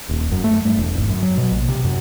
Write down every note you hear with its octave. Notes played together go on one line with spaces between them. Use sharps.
D#1
F#2
A3
G2
E1
G#1
F#2
F#3
B2
A#1
C3
F#2